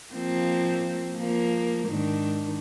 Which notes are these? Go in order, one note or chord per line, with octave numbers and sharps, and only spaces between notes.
F3 A#3 C4
F3 A#3
G#2 D#3 D4